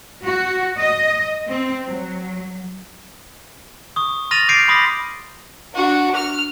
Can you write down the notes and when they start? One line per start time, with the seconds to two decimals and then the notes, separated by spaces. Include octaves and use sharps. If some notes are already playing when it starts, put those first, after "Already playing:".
0.24 F#4
0.79 D#5
1.48 C4
1.87 F#3
3.96 C#6 D#6
4.31 C6 F6 A6 A#6 D#7 F7
4.48 D6 G6 A6 C7 D7
4.68 B5 C6 D6 D#6 A#6 B6
5.73 D4 F#4
6.15 F6